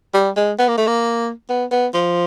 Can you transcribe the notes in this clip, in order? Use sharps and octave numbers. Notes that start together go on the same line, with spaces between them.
G3
G#3
B3
A#3
A3
A#3
B3
B3
F3